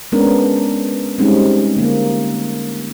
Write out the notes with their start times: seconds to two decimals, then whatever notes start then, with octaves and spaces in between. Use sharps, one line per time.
0.12 G#3 B3 C#4 D4 A#4
1.18 G3 G#3 C4 C#4 D#4
1.76 D3 A#3